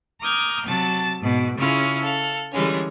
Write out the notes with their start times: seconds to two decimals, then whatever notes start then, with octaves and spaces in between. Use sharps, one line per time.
0.21 A#5 D6 D#6 F6 G6 G#6
0.65 C3 F#3 A5 A6
1.19 G#2 B2
1.57 C#3 C#4 E4 F4 G#4
2.01 A4 F5
2.52 D3 E3 G3 G#3 C#4